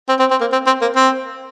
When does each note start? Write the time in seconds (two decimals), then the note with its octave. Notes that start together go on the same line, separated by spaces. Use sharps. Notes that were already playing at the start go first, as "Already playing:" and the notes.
0.09 C4
0.19 C4
0.31 C4
0.41 A#3
0.52 C4
0.66 C4
0.81 A#3
0.96 C4